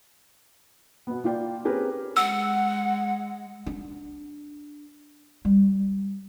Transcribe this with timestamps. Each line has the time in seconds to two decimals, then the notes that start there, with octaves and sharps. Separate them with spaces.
1.07 B2 B3
1.24 A#3 F4 D5 G5
1.65 C4 C#4 G4 G#4 A#4 B4
2.17 G#3 F#5 E6
3.66 D4
5.45 G3